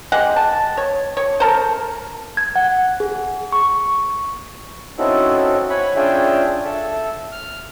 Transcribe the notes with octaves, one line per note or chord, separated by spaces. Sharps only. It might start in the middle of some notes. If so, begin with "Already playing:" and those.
G#3 G4 F#5
A5
C#5
C#5
A4 A#4 C5
G#6
F#5
G#4
C#6
C4 C#4 D#4 E4 F#4 A4
C#5 F#5 G#5 B5
C#4 D4 F4 G#4 E5 G5
A4 E5
F6